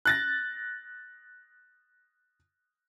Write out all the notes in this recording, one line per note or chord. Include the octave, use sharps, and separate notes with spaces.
F#6 A6 A#6